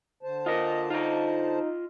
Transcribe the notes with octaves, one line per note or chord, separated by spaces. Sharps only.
D3 C5 A5
F4 A#4 D#5
D#4 F4 D#5